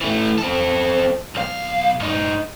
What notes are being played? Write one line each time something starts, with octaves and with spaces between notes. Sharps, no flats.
E3 A3
C4 A4
B1 F5
G2 D#4